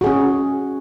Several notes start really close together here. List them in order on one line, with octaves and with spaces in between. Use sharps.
F#4 G#4 C#4